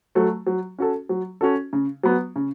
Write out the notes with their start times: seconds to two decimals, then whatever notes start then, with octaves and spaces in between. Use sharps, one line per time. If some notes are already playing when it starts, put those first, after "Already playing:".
0.15 F#3 A3
0.47 F#3
0.79 C#4 F#4 A4
1.09 F#3
1.41 C#4 F#4 A4
1.73 C#3
2.04 F#3 B3
2.36 C#3